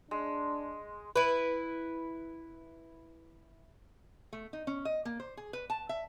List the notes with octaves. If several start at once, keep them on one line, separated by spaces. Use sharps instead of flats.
G#3 D4
E4 B4
A3
D#4
C#4
D#5
A#3
C5
G#4
B4
A5
E5